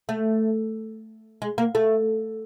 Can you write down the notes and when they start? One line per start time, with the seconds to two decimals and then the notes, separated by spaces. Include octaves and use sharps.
0.09 A3
1.42 G#3
1.58 A#3
1.75 A3